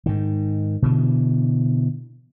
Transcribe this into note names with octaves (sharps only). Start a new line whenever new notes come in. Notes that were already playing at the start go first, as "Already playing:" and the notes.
G#2 D#3
B2 D3 E3